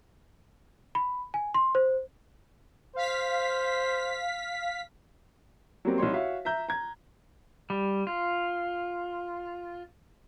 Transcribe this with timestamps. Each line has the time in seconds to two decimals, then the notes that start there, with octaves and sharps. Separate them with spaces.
0.95 B5
1.34 G#5
1.54 C6
1.75 C5
2.96 C5 F5 B6
5.85 F#3 G3 A#3 C4
5.98 C2 D#4 C#5 C6
6.13 F#4 C#5 E5 F5
6.45 E5 A#5 G6
6.68 A#5 G#6
7.70 G3
8.07 F4